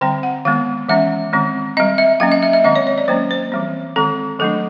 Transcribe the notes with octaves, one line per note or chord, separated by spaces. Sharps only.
D3 G3 C4 G5
F#5
D#3 G#3 B3 F5
E3 G#3 C#4 E5
D#3 G#3 C4
G3 C4 D#5
E5
F#3 A#3 C#4 F5
D#5
E5
E5
D#3 G#3 C4 D#5
C#5
C#5
D5
F#3 A#3 C#4 C5
C5
E3 G3 C4
D#3 G#3 C4 A4
D#3 F#3 A3 D4 A4